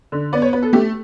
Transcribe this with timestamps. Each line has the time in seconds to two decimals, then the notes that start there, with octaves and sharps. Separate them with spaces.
0.12 D3
0.33 B3 D5
0.42 C#5
0.53 B3 B4
0.62 A4
0.73 A3 G4